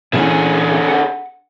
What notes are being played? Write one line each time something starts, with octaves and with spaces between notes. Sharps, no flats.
A#2 D3 E3 C#4 G#4
F#5